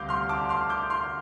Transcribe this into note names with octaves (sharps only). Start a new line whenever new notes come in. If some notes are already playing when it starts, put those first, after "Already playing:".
Already playing: D2 C3 G3 F5 D6 G6
C6 F6
A5 D6
C6 F6
D6 G6
C6 F6